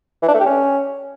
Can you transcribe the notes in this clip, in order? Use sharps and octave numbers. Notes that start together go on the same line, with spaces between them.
E3
D4
A3
G4
C#4